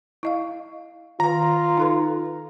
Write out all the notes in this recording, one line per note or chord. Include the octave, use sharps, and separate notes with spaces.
E4 D#5 F5
D#3 F4 B4 A#5
D#4 A4 B4